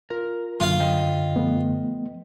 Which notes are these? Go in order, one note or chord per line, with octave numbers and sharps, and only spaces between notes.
F4 A#4
F#2 D3 F#3 A#3 F4 F5
C5 D#5 G5
F3 A3 B3